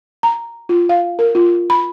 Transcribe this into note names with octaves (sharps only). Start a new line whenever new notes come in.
A#5
F4
F5
A#4
F4
B5